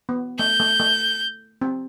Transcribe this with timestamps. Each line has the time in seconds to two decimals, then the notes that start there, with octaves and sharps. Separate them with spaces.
0.09 B3
0.39 A3 G6
0.60 A3
0.80 A3
1.61 C4